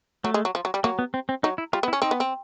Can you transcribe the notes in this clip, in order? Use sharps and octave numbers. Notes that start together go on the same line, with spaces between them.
F#3 A3
G#3
F#3
F3
F#3
G3
F#3 A#3
B3
C4
C4
F#3 D#4
E4
G3 F4
B3
E4
C#4
C4 D#4
B3
C4